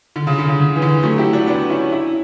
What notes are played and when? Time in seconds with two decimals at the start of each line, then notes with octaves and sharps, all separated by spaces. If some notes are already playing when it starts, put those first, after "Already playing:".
0.16 D3
0.27 C#3
0.38 D3
0.48 C#3
0.60 C#3
0.76 E3
0.82 D3
1.03 F#3 A3
1.18 E4 G4
1.33 D4 F#4
1.47 B3 D4
1.70 C#4 E4
1.92 C#4 E4